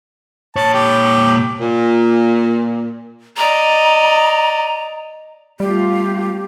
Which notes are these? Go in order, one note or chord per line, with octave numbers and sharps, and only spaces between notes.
A#2 C#5 A5
G4
A#2
D5 D#5 A#5
G3 A3 B3 F4 G4